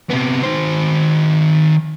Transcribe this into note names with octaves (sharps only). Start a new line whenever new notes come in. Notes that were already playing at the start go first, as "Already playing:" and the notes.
C3 B3
D#3 C5